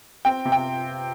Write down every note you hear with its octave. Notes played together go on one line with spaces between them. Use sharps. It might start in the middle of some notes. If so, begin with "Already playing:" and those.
C4 G5
C3
G5